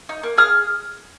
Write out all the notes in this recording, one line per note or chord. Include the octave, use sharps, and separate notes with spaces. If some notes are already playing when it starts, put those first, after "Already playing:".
D#4
A#3
G#4 D#6 F6